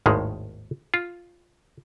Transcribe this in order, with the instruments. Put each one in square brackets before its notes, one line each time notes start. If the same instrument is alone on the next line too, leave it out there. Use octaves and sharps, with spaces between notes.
[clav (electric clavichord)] G#1 D#2 A2 D#3 G#3
F4